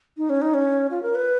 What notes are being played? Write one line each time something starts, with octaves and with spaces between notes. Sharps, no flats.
D#4
C#4
D#4
C#4
F4
A#4
B4